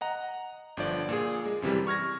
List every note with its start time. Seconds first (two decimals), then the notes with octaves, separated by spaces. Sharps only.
0.01 D#5 F#5 A#5
0.77 G1 D3 F3 D5
1.09 A#2 G#4
1.45 G#3
1.62 F#2 C3 E3 G3
1.87 C#6 F6 G#6 A#6